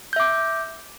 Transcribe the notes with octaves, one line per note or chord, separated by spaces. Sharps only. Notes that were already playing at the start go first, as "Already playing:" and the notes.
E5 D6 G6